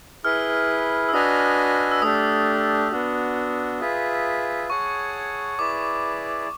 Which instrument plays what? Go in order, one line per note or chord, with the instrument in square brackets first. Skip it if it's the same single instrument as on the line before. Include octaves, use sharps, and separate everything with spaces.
[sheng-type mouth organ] E4 G#4 B4 [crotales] F6
[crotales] E6
[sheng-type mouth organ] D4 F#4 B4 D#5 G#5 [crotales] D#6
[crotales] E6
[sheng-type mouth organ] A3 D4 G4 [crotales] D#6
[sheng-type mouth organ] B3 D4 F#4
F4 G#4 B4 E5
[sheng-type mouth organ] G#4 C#5 F#5 A5 [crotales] C#6
[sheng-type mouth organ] E4 G#4 B4 D5 [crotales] D6